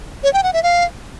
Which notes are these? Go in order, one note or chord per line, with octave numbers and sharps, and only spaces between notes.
C#5
G5
F#5
E5
F5